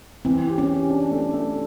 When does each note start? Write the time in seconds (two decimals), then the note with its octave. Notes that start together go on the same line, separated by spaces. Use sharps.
0.25 E3 C4
0.47 G4
0.58 C#4
0.69 G4
0.90 D4
1.11 A3
1.33 A3